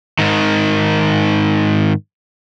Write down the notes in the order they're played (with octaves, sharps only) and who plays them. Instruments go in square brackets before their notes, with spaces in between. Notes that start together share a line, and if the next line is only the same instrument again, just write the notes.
[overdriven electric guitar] G#2 D#3